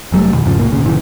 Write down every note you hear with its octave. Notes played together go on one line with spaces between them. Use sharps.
F1 F#3 G3 A3
F2 B2 D#3
E2 G#2 C#3 F3
C2 A2 A#3
A1 D2 A#2 C#3
G1 A#2 C#3 E3